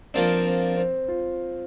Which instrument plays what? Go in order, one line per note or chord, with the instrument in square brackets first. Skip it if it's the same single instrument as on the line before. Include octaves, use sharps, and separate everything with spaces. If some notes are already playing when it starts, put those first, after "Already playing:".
[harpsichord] F3 A#3 D4 [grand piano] C4
[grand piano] C4
C4
F4